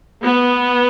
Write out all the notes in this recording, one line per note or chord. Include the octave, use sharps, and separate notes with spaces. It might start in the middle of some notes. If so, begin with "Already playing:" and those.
B3